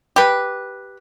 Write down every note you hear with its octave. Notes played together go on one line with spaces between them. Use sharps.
G4 B4